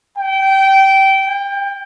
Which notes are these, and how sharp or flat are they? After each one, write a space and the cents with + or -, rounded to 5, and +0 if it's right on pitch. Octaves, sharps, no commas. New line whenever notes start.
G5 -20
G5 +30